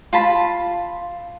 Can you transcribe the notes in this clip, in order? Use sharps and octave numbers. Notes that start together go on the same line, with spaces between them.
F4 A5 B5